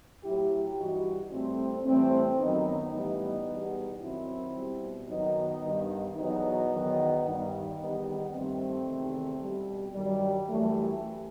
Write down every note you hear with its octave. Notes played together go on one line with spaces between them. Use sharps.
A2 F#3 E4 G4
G2 E3 G3 D#4 F#4
A2 G3 A3 C4
A2 E3 G3 A3 C4
F#2 D#3 F#3 B3 D#4
A2 E3 G3 B3 D#4
E2 B2 G3
F#2 D#3 F#3 C4 E4
B2 G3
F#2 D#3 F#3 B3 D#4
G2 D#3 G3
E2 B2 F#3 B3 D#4
E2 D#3 F#3
G2 D#3 G3
E2 D#3 G3 B3 D#4
G2 D#3 G3 A3 C4
E2 C3 D#3
B2 G3
G2 D#3 F#3 G3
F#2 E3 G3 A3